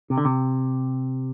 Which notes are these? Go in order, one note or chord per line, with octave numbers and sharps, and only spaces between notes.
C3
D3
C3